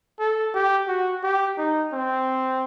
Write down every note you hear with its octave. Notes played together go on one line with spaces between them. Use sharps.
A4
G4
F#4
G4
D#4
C4